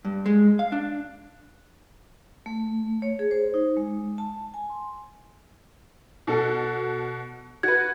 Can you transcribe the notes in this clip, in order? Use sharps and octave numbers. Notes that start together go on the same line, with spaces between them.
G2
G#3
F5
D4
A3
C#5
G#4
C5
D#4
G#3
A5
G#5
C6
B2 F#4 A4
F#4 B4 G#6